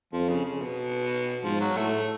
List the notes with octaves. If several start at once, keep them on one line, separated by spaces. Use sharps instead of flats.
F2 F3
C#3
C#3
B2
G#2 F3
F#3
A2 A3